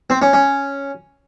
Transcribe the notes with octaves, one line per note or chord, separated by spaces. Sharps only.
C4
C#4
C#4